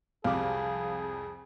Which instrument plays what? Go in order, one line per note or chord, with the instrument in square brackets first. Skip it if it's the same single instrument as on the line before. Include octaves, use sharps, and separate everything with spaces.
[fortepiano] C2 G#3 D6 [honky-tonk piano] F2 G3 [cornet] G#4 [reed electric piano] F5